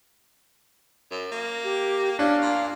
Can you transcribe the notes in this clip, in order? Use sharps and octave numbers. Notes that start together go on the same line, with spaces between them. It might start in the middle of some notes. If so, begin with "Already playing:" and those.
F#2
A#3
G4
C#4 D4 F5
A#2